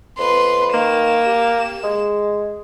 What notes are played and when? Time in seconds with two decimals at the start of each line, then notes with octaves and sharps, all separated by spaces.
0.18 F2 B4 C6
0.74 D#3 A#3 E7
1.26 G4
1.84 G#3